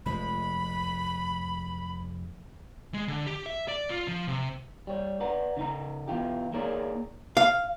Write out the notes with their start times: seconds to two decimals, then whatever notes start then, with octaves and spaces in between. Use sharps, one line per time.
0.06 F1 F3 G#3 B5
2.94 G#3
3.08 D3
3.27 G4
3.46 E5
3.68 D5
3.90 F4
4.08 F3
4.28 C3
4.87 G3 C#5
5.21 B4 D5 F#5 A#5
5.57 C#3 D#4 A#5
6.08 B2 E3 F4 G4
6.53 A#3 D#4 G#4 A#4 C#5 D5
7.37 F5